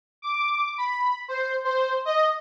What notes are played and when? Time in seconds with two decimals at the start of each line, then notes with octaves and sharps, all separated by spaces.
0.22 D6
0.78 B5
1.28 C5
1.65 C5
2.05 D#5